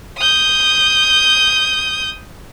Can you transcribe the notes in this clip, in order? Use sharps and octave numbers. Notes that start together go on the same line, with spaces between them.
D#6 G6